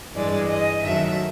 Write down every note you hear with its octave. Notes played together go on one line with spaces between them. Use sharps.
G2 E3 G#3 D5
D#5
F#2 D#3 F#3 A3 E5